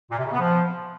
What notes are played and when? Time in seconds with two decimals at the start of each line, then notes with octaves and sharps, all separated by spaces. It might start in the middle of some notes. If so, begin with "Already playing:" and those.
0.11 A#2
0.18 C3
0.25 C#3
0.33 B3
0.40 F3